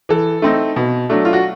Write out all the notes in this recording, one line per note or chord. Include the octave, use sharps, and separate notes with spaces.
E3 A4
A3 C4 D#4
B2
F#3 A3 D4
F4
F#4